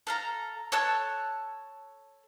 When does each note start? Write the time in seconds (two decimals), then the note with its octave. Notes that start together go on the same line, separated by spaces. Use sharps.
0.07 A4 F5 A#5
0.72 A4 C#5 A5 F#6